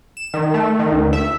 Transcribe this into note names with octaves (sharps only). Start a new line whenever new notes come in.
E7
D#3
A3
D#3
D2
E5